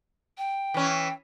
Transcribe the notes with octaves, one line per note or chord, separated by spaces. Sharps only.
G5
E3 C#4